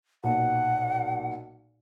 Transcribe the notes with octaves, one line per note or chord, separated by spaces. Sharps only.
B1 A#2 F#5